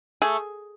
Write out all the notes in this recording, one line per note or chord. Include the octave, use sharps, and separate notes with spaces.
A3 G#4